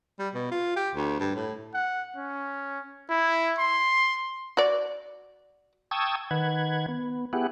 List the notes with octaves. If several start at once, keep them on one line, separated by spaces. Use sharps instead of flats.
G3
B2
F4
G4
D2
G2
A2
F#5
C#4
E4
C6
F#4 D5
G5 A5 C#6 D#6 E6 G#6
D#3 B4 F#5 G#6
B3
B3 E4 G4 G#4 F#5